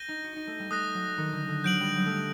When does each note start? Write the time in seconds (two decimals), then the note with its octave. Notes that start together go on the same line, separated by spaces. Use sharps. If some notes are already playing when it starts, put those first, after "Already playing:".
Already playing: G6 A#6 D#7 G7
0.08 D#4
0.24 F#4
0.36 D#4
0.47 A3
0.59 G3
0.70 A3 D#6 F#6 A#6
0.94 F#3
1.17 D#3
1.32 D3
1.48 D3
1.64 F#3 G6 D7 F#7
1.80 G3
1.96 F#3
2.06 A3
2.11 G3